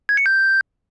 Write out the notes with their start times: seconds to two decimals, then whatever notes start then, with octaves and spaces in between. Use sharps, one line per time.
0.09 G#6
0.17 C#7
0.26 G6